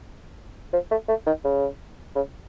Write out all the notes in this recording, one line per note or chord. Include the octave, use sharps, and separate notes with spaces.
F3
A3
A3
D#3
C#3
C#3